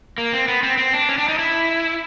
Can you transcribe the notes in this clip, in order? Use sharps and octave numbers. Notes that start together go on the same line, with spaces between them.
A#3
C4
B3
C4
C4
D4
C#4
D4
D#4
E4